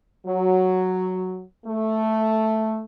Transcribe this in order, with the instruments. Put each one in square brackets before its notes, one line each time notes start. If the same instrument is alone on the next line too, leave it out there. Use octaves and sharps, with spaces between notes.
[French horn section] F#3
A3